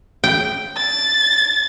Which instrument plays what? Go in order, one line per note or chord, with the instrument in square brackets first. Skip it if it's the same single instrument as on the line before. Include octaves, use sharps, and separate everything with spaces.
[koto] G5
[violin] A6